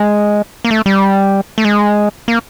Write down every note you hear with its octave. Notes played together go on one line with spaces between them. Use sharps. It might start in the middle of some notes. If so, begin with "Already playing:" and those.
Already playing: G#3
A#3
A3
G3
A3
G#3
A#3